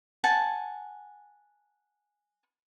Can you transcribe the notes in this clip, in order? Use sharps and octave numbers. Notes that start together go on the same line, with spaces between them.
F#5 G#5 A5